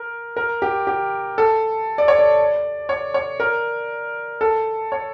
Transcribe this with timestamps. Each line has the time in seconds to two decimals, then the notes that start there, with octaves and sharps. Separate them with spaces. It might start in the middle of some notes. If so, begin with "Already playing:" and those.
Already playing: A#4
0.37 A#4
0.62 G4
0.87 G4
1.38 A4
1.98 D5
2.08 C#5
2.19 D5
2.89 C#5
3.14 C#5
3.40 A#4
4.41 A4
4.92 C#5